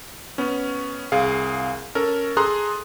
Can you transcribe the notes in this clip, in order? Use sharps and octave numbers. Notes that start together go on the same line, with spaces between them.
B3 C#4
C2 G#4 F5
C#4 A4 A#4
G#4 A4 A#5 C6 D#6 F#6